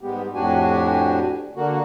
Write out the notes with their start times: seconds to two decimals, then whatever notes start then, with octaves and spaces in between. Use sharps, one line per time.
0.01 G#2 G3 G#3 B3 G4
0.34 F2 A2 D4 F#4 G4 G#5
1.56 D3 A#3 F#4